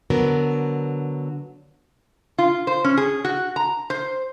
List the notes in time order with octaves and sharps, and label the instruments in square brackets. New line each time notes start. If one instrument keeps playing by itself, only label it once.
[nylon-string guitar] D3 F#3 B3 A#4
[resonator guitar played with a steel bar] F4
C5
C#4
G#4
F#4
A#5
C5